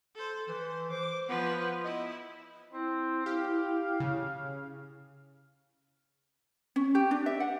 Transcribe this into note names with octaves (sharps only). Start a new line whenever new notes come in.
A4 C5
E3 C5
C5 D6
F3 B3 B4
E4 D#5
C4 E4
G4 F5
C#3
C#4
G4
D4
E5
F#5